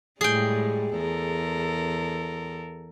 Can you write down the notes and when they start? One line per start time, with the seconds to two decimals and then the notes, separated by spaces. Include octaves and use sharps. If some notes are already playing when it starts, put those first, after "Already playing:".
0.21 A2 G3 G#3 G#4 G5
0.97 E2 A4 A#4